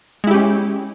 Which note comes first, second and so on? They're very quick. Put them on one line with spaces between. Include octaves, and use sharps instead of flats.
G#3 E4 G4 C#4